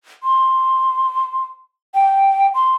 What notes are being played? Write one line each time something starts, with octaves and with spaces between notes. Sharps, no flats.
C6
G5
C6